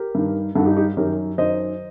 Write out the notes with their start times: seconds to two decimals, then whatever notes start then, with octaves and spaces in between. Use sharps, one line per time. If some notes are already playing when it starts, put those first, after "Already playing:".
Already playing: G4 A#4
0.15 G2 D#3
0.55 G2 D#3 F#4 A4
0.66 D#4 G4
0.77 D#4 G4
0.97 F#2 D#3 G4 A#4
1.38 F#2 D#3 C5 D#5